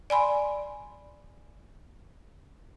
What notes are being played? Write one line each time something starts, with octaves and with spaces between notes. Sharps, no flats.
D5 G#5 B5 C6